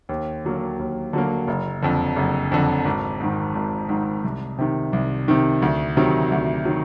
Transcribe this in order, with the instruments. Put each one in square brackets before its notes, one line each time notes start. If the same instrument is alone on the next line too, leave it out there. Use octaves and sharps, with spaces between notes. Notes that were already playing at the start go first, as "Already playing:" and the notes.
[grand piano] D#2
D3 F#3 A#3
D#2
D3 F#3 A#3
F#1
F2 D3
F#1
F2 D3
G#1
G#2 D#3
G#1
G#2 D#3
C2
C3 D#3
C2
C3 D#3
D2
C3 D#3 F#3
D2
D#3 F#3